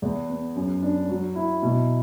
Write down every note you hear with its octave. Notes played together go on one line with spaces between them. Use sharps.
E2
B3
F#2
D4
F#3
E4
B2